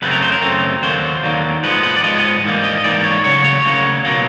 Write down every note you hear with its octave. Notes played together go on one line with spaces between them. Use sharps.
F#2 C#3 F#3 A3 C4 B4
A#4
C5
A#4
F#2 C#3 F#3 A3 C4
D#2 D3 F#3 A#3 C5
D#2 D3 F#3 A#3
G#2 F3 G#3 B3 B4
B4
D5
G#2 F3 G#3 B3 D#5
G#2 E3 G3 A#3
D#5
G#2 E3 G3 A#3 D5
C#5
D2 C#3 F#3 C#5
C#5
D2 C#3 F#3 A#3
B2 F#3 A#3